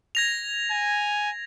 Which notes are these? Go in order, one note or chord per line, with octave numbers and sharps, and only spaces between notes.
G#6 A#6 F7
G#5